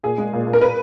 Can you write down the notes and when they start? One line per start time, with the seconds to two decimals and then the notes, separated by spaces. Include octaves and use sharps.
0.03 A#2 G#4
0.18 G#3
0.33 A#2
0.47 A#2
0.53 A#4
0.61 B4